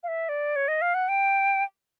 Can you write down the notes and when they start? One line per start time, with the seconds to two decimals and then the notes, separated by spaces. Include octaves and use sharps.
0.03 F5
0.08 E5
0.29 D5
0.56 C#5
0.68 D#5
0.82 F5
0.94 F#5
1.09 G5